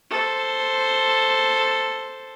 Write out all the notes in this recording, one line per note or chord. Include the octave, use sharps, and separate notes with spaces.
A4 C5